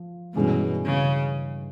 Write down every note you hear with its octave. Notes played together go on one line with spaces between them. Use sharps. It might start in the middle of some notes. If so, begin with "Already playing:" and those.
Already playing: F3
G2 B2 E3 G#3 C#4
C#3